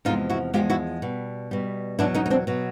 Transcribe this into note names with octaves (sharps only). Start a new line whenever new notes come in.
E2 C3 F3 G#3 D#4 F4
E4 F#4
E2 C3 F3 G#3 F4 G4
E4 F#4
B2 G3
B2 G3
E2 B2 F#3 D4 E4
C#4 D#4
D#4
C4 D4
B2 F#3